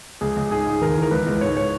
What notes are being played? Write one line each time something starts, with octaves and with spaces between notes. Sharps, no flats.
C#2 G#4
C#2
G#2 G#4
G#2
D#2 A#4
E3
A#4
C#2 B4
C#2
G#2 C#5
C#5